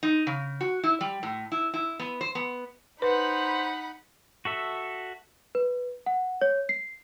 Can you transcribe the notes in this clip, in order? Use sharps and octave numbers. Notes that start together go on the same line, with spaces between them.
D#4
C#3
F#4
E4
G3
A2
E4
E4
B3
C5
B3
D#4 B4 C5 F#5 B5
F#4 A4 E5
B4
F#5
C#5
C7